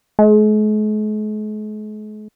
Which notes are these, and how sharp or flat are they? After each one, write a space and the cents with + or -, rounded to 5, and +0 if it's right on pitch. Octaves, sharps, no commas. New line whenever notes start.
G#3 +45